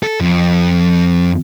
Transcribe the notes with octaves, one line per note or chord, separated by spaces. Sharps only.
A4
F2